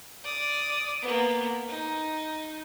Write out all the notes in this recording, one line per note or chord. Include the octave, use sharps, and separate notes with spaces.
D5 D#6
A#3 B3
D#4